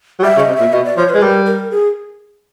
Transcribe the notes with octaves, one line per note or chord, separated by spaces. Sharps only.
F#3
G3 E5
C#3
D#5
C3
A#2 E5
B2 D#5
D5
F3 C#5
B4
G#3
G3 A#4
A#4
G#4